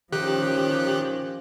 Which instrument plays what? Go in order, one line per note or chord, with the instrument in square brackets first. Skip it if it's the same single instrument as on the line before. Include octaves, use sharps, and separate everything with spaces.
[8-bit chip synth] D#3 G4 F#6 [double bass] F3 C#4